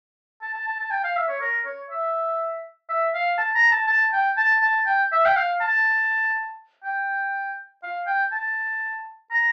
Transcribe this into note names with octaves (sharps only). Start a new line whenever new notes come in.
A5
A5
A5
A5
G5
F5
E5
C#5
A#4
C#5
E5
E5
F5
A5
A#5
A5
A5
G5
A5
A5
G5
E5
G5
F5
A5
G5
F5
G5
A5
A#5